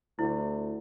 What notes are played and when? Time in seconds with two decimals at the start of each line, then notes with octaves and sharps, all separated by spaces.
0.19 D2 E4